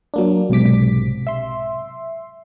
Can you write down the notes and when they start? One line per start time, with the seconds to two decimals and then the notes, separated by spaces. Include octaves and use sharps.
0.14 F#3 A#3 D4
0.50 B1 G#2 C3 D6 B6
1.27 E5 C6